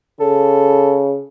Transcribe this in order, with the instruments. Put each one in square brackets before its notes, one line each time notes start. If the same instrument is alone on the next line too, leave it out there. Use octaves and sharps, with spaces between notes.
[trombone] C#3 [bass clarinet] A4